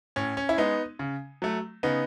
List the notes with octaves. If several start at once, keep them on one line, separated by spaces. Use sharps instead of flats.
A2 C#4
C#4
E4
G#3 B3 D#4
C#3
F#3 A3
C#3 B3 D#4